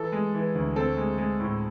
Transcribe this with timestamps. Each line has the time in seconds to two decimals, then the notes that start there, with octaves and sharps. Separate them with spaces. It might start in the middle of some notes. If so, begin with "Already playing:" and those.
Already playing: E3 A4
0.12 G#3
0.34 E3
0.55 D2
0.76 C4 A4
0.97 G#3
1.18 G#3
1.40 A2